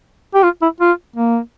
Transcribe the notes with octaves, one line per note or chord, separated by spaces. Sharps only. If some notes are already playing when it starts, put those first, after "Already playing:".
G4
F4
E4
F4
A#3